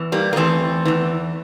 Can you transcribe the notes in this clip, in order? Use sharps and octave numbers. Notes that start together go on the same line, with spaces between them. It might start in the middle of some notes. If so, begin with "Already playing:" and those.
Already playing: E2 E3
G3 A#3
A#3
E2 E3 A3 C4
E2 E3